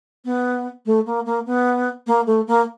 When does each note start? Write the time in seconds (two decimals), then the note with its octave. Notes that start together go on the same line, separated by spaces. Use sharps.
0.25 B3
0.86 A3
1.06 A#3
1.26 A#3
1.47 B3
2.07 A#3
2.27 A3
2.47 A#3